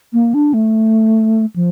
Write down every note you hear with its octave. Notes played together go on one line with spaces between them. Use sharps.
A#3
D4
A3
F3